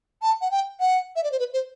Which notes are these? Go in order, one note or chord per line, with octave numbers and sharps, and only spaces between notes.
A5
F#5
G5
F#5
E5
D5
C5
B4
C5